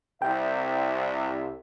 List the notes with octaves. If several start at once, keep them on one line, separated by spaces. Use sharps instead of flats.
C2 E5 G5